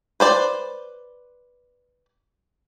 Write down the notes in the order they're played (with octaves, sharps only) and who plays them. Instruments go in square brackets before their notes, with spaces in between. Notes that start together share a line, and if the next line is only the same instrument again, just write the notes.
[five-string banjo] B4 C5 D5